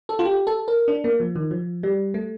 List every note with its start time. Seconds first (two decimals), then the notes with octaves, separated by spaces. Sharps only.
0.09 A4
0.19 F4
0.25 G4
0.47 A4
0.68 A#4
0.88 D4
1.04 A#3
1.20 F3
1.36 D#3
1.51 F3
1.83 G3
2.14 A3